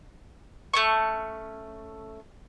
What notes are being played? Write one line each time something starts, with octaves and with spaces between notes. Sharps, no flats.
A3 C#4 C#6